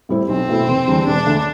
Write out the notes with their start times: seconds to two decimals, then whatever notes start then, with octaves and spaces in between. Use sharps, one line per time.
0.09 A2 G3 C4 E4
0.29 B1 C4
0.48 B2 A3 E4
0.68 F1
0.88 E2 D3 G3 D4
1.07 E1 D4
1.26 D2 D3 A3